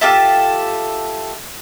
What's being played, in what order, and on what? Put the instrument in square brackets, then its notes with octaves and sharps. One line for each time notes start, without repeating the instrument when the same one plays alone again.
[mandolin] F4 G4 A4 E5